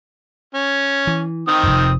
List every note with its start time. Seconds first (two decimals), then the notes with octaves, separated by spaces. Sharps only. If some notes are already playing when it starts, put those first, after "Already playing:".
0.54 C#4
1.07 E3
1.48 D#3 C4 D#6
1.63 F1 F2